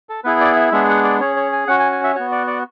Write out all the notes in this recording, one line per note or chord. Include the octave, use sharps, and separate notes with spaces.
A4
B3 E4 G#4 B4
D5
E5
G#3 B3 D4 G#4 E5
F#5
D5
C#4 G#4 C#5
C#5
G#5
C#4 F#4 F#5
G#5
G#5
E5
B3 F#4 C#5
D5
D5